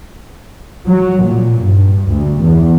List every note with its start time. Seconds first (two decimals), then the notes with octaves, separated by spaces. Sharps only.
0.86 F#3
1.24 A#2
1.61 G2
2.09 D2
2.41 E2